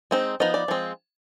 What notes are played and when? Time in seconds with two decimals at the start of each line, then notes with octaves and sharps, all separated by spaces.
0.11 G#3 C4 D#4
0.40 F3 B3 D#4 D#5
0.54 D5
0.68 F3 G#3 C4